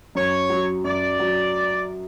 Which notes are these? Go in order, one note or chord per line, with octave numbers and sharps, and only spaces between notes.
F#2 C#5
F#3
F#2 D5
F#3